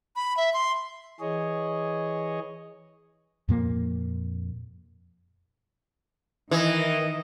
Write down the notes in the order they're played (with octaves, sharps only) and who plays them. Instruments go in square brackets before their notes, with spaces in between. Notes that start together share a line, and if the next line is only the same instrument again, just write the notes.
[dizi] B5
E5
C6
[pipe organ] E3 G#4 C#5 D#5
[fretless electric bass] F2 A#2 A#3
[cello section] D#3 [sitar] E3 [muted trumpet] D#5